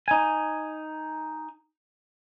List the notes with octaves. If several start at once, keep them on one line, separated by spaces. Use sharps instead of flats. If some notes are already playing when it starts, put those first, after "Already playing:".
D#4 G#5